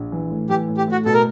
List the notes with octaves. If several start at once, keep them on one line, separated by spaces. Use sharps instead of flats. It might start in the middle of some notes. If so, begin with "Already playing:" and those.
Already playing: A#1
E3
A2
E3 G4
A2
G4
A2 F#4
B2 A4
A#4